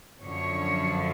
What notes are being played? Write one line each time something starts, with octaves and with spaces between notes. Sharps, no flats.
F#2 D3 F3 C#5